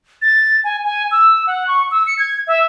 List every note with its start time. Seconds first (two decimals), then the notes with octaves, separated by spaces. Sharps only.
0.22 A6
0.64 G#5
0.84 G#5
1.11 E6
1.47 F#5
1.68 C#6
1.91 E6
2.07 C#7
2.19 G#6
2.47 E5